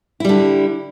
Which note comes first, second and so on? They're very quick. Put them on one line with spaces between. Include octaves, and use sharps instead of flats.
E4 G3 D3